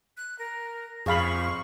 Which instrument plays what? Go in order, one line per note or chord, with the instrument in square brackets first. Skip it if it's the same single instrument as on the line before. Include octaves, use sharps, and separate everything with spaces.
[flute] F#6
A#4
[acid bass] F2 [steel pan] G#4 F5 B5 [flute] C#6